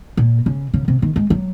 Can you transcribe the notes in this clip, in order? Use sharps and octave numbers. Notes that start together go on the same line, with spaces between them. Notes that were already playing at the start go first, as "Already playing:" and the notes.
A#2
C#3
C#3
C3
D#3
G#3
F#3